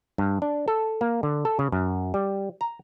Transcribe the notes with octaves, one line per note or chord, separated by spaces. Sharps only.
G2
D4
A4
A#3
D3
A4
C#3
F#2
G3
A#5